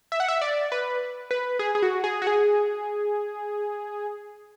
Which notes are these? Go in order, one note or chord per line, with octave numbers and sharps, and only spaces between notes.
E5
F#5
E5
D5
B4
B4
G#4
G#4
F#4
G#4
F#4
G#4